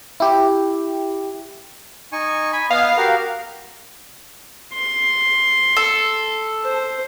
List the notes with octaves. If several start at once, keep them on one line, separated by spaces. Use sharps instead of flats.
E4 G4
D#4 G#5 C#6
G#5 B5
B3 D#5 F5 D#6
F#4 G4 A#4
C6
A4
C5